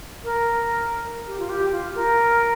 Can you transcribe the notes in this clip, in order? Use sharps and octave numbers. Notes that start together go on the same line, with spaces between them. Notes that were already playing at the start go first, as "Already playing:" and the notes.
A#4
G4
F4
G4
F4
A#4